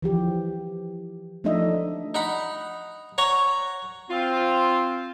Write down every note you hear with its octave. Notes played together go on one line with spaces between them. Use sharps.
E3 F3 G4
F3 A3 D4 D#4 D#5 E5
D#4 F#5 B5
C#5 F#5 A#5 C#6
C4 F4